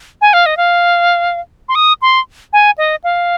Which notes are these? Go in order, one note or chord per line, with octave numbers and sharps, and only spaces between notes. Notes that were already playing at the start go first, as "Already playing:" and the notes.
G#5
F5
D#5
F5
C6
D#6
C6
G#5
D#5
F5